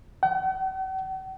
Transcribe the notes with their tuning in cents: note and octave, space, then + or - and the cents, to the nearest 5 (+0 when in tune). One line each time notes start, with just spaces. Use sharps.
F#5 +45